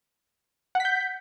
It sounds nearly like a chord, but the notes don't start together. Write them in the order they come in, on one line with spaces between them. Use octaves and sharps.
F#5 B6 G6